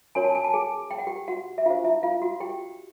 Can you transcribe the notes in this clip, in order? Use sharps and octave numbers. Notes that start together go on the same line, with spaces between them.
C#4 F#4 A#4 C#5 G#5
A5
G#5
A5
G#4 G#5
G5
F#5
G4 G5
F#4 F#5
E5
D4 F4 G4 C5 F5
E4 E5
F4 F5
F#4 F#5
G4 G5